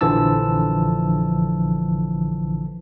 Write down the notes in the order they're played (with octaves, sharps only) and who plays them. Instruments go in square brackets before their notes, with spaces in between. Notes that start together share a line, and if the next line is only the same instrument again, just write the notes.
[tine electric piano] A#1 D3 E3 F3 A5 E6